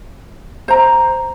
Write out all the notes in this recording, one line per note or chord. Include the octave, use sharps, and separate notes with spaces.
C5 A#5